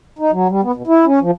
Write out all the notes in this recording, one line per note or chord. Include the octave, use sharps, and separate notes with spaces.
D#4
F#3
G3
B3
B2
E4
C#4
F3